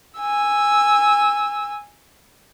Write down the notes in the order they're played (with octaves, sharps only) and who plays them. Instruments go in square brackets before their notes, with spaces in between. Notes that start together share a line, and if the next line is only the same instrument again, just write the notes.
[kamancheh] G#5 E6